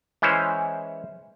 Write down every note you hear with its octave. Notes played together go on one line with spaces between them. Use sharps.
E3 G#3 C#4 E4 C5 C#5